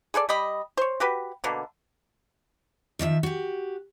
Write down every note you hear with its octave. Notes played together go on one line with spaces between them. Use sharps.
G#4 A4 B4 D5
G3 G4 D#5 B5
C5 C#5
F#4 G4 B4
B2 D3 A#3
D#3 F3 D5 E5
F#4 G4